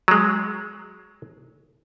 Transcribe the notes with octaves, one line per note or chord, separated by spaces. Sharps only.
F#3 G#3